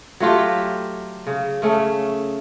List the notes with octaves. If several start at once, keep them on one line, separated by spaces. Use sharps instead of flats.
F#3 A3 F4 G4
C#3
C#3 A3 C#4